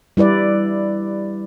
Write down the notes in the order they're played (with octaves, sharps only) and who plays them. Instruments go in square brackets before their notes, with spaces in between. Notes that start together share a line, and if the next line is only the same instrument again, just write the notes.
[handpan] G3 E4 B4 D5